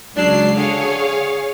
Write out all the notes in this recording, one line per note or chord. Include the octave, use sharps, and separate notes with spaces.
C#2 F#3 D4 C7
D3 G#4 C#5 F5